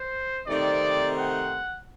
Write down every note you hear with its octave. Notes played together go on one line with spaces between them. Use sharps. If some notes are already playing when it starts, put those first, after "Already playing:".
Already playing: C5
C3 D#3 A3 C4 D#4 D5
F#5